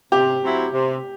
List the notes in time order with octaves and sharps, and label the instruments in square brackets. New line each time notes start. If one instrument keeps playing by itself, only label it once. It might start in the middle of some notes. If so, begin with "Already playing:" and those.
[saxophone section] C3 [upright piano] G4
[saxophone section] F#3 C4 E4
C3